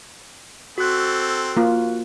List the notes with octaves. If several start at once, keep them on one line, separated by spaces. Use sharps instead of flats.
C4 F#4 A4 F#6
A#3 F4